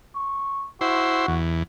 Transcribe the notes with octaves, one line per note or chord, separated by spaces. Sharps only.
C#6
E4 F#4 C5
E2